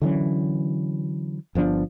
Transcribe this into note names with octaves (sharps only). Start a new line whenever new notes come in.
D3 E3 F#3 C#4
G1 F3 B3 D4